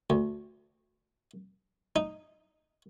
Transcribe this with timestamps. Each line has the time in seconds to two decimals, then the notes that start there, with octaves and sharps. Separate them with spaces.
0.10 D2
1.96 D#4